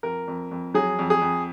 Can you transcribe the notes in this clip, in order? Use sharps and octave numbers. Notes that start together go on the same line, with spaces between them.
F2 A#4
F2
F2
F#3 G#4
F2
G#4
F2